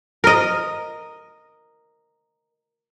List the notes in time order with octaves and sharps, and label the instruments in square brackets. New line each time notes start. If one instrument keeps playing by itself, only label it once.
[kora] A#4 D#5